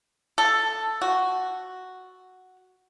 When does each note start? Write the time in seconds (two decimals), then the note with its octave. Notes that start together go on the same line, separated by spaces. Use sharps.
0.38 A4
1.01 F#4